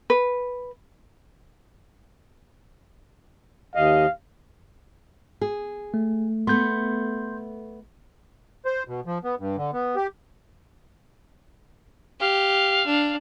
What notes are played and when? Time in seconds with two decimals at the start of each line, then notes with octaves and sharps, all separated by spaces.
0.10 B4
3.75 D#2 D#5 F5
5.41 G#4
5.94 A3
6.47 A3 B3 C6 G6
8.65 C5
8.88 B2
9.06 F3
9.24 B3
9.39 G2
9.57 D3
9.73 B3
9.96 G4
12.20 G4 F5
12.86 D4